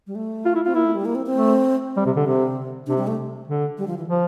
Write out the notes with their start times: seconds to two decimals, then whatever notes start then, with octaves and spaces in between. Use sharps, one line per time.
0.07 G3
0.15 A3
0.45 F4
0.55 E4
0.65 C4 F4
0.75 A#3 E4
0.85 A3
0.95 G3
1.05 A#3
1.15 C4
1.26 C4
1.35 A3
1.96 G3 C4
2.06 C3
2.17 D3
2.26 C3 C4
2.87 C3 D4
2.98 G3
3.07 A3
3.48 D3
3.78 G3
3.88 F3
3.98 E3
4.08 F3